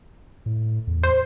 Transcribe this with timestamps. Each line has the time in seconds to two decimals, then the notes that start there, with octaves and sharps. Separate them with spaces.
0.46 A2
0.87 E2
1.03 C5